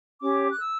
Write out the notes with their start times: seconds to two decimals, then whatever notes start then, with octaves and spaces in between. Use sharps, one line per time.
0.21 C#4 G4 C#5 D6
0.49 F#6
0.59 E6